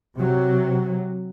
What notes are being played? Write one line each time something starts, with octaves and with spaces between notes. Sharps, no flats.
C3 F#3